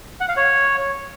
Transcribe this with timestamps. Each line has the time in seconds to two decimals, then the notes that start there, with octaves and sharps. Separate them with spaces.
0.21 F#5
0.29 F5
0.37 C#5